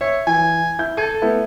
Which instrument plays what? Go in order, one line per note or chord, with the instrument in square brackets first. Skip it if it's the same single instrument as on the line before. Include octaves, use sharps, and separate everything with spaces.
[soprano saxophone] C#5 [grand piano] E5
[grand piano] E3 [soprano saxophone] G#5
[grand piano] E4 G6
[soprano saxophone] A4 [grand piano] G#6 D#7
[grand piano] A3 B3 E4